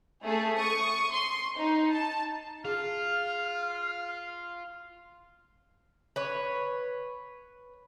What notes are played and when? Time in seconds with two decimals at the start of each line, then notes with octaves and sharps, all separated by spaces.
0.23 A3 G#4
0.57 C#6 D#6
1.11 C6
1.57 D#4
1.92 A5
2.65 F4 G#4 F6
6.16 B4 C#5